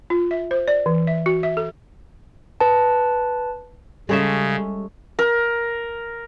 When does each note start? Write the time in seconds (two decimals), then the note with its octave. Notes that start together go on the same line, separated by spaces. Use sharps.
0.10 F4
0.31 E5
0.51 C5
0.68 D5
0.86 E3
1.07 E5
1.26 F#4
1.43 E5
1.57 A4
2.61 B4 A5
4.09 C#3 G3 G#3 C#4 A4 E5
5.19 A#4